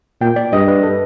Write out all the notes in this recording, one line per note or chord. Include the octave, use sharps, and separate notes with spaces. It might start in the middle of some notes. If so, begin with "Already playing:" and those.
A#2 G5
D5
G2 D#5
B4
A4